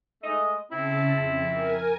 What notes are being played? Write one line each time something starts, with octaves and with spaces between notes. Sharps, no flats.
G#3 A3 D#5
C#3 C4 E4 A5
F2
A#4 G#5